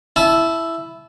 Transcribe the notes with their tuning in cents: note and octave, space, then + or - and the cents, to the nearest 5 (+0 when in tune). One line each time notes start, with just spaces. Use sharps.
E4 +5 A5 -20